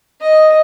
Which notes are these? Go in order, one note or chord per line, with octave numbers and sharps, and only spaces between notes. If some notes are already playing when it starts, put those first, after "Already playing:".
D#5